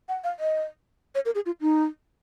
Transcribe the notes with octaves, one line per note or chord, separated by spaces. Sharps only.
F#5
F5
D#5
C#5
A#4
G#4
F4
D#4